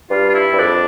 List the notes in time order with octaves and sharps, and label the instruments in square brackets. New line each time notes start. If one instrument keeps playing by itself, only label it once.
[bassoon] G2 [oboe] F4
[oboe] F4
E4
[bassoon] G2
[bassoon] F2 [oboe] D4